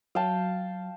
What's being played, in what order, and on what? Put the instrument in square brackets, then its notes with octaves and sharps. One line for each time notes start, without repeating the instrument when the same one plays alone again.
[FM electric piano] F#3 [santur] F5 G5 A5